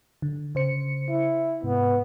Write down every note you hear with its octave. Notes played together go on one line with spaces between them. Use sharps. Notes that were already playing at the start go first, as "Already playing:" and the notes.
D3
C#3 C5 C#7
E4
G#2 C3 B3